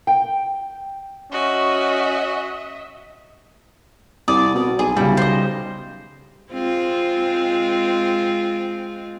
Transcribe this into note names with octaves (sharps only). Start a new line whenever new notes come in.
G5
C#4 F#4 D#5 E5
C2 D5 D#6
B2
B1 G#4
C#3 G3 E4
C5 D#5
G#3 C4 F4